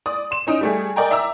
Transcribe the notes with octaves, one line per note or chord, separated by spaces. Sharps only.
D5 D#6
C6 E7
C#4 D#4 D#6 D7
G3 A3 G#4
A#4 D5 D#5 G5 G#5 A#5
E5 A#5 D6 E6